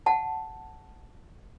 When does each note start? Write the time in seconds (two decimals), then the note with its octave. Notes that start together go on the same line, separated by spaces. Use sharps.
0.06 F#5 A5